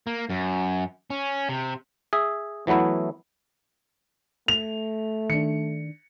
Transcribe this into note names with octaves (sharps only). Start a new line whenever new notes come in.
A#3
F#2
C#4
C3
G#4 E5
E3 F#3 A3 B3 E4
A3 F7
D#3 D4 C#7